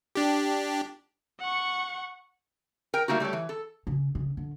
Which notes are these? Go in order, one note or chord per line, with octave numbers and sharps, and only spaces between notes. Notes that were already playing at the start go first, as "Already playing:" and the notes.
D4 G4
F#5 C#6
A#4 G5
G3 A3 A#3 D#4 F#4
G3 A3 A4 C#5
E3
A4
C#3
C#3
D3